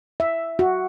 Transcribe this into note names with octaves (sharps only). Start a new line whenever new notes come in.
E5
F#4